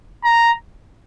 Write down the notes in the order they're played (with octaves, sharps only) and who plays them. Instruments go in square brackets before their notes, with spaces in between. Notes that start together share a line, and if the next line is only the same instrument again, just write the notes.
[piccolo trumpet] A#5